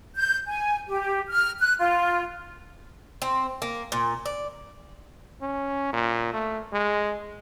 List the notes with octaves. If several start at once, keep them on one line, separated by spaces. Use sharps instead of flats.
G6
G#5
G4
F6
F#6
F4
C4
A#3
A#2
D5
C#4
A#2
A3
G#3